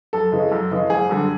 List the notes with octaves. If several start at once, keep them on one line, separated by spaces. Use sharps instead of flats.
F#2 A4
C#3 E3 G#3
F#2
C#3 E3 G#3
F#1 G#4
F#2 D3 G3